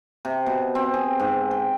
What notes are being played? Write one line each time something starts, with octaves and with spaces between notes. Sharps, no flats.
C3
B2
C4
G#4
G#2
G5